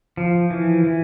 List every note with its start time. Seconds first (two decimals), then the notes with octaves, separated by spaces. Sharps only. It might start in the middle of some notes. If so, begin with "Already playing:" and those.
0.17 F3
0.50 E3
0.84 E3